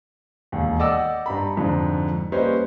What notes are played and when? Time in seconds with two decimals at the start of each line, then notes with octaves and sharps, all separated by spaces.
0.52 E1 D#2
0.79 D5 D#5 F#5 G5 D6 E6
1.26 G2 A#5 B5
1.57 F2 G#2 D3
2.32 G3 A#3 C#4 B4 C5 D#5